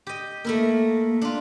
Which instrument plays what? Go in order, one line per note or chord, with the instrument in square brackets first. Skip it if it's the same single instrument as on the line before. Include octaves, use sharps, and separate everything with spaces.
[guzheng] G4 D#5
[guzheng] A3 E4 A#4 [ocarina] A#3
[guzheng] D4 F4